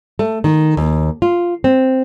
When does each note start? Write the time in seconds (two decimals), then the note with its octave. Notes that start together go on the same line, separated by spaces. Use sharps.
0.19 A3
0.44 D#3
0.77 D#2
1.22 F4
1.64 C4